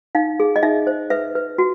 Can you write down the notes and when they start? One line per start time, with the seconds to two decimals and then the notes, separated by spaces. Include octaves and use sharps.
0.15 D#4 F5
0.40 G#4
0.56 D#5
0.63 D#4 E5
0.87 C5
1.10 B4 E5
1.35 B4
1.58 F#4